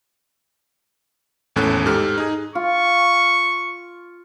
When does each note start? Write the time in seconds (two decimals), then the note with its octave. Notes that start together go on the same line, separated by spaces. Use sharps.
1.56 G#1 E2 A2 C#4 A4 F#6
1.86 G#2 G4 A4 F6
2.18 D#4 G#4
2.55 F4 C#6